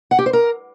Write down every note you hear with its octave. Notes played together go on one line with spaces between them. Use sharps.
F#5
G4
C5
A#4